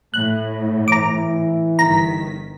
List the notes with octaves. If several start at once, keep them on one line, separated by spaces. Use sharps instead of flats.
A2 F#6
E3 A#5 D6
G1 D#3 A#5 B6